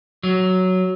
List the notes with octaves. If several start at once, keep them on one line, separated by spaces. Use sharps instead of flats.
F#3